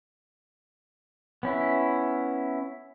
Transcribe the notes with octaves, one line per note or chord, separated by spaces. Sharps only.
B3 C#4 E4